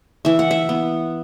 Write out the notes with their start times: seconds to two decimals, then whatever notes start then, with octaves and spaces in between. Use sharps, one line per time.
0.25 E3 E5
0.39 F#5
0.51 E5
0.69 B3